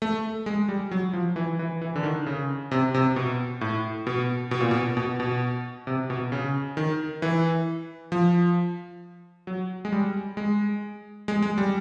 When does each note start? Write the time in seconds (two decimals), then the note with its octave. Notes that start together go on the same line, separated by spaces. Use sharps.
0.02 A3
0.46 G#3
0.69 G3
0.91 F#3
1.13 F3
1.36 E3
1.59 E3
1.81 E3
1.96 D3
2.03 D#3
2.26 C#3
2.71 C3
2.94 C3
3.16 B2
3.61 A2
4.07 B2
4.51 B2
4.61 A#2
4.71 B2
4.97 B2
5.20 B2
5.87 C3
6.10 B2
6.32 C#3
6.77 D#3
7.22 E3
8.12 F3
9.47 F#3
9.85 G#3
9.92 G3
10.37 G#3
11.28 G#3
11.42 G#3
11.58 G3